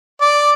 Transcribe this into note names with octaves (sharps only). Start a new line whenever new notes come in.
D5